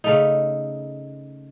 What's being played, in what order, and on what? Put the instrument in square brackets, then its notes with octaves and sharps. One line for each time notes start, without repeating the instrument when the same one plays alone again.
[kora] C#3 A3 D#4